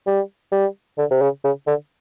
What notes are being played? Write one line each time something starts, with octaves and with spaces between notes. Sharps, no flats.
G3
G3
D3
C3
C#3
C#3
D3